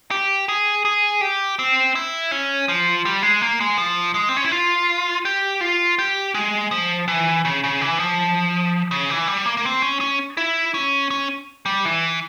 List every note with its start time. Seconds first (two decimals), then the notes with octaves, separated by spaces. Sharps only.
0.11 G4
0.49 G#4
0.85 G#4
1.21 G4
1.59 C4
1.95 E4
2.31 C#4
2.68 F3
3.05 G3
3.23 G#3
3.41 A#3
3.60 G#3
3.78 F3
4.14 G#3
4.29 C4
4.37 C#4
4.44 E4
4.52 F4
5.25 G4
5.61 F4
5.99 G4
6.34 G#3
6.71 F3
7.08 E3
7.45 C#3
7.64 C#3
7.81 E3
7.99 F3
8.91 C#3
9.10 E3
9.27 G3
9.46 A#3
9.57 A#3
9.65 C4
9.82 C#4
10.01 C#4
10.37 E4
10.74 C#4
11.11 C#4
11.66 G3
11.85 E3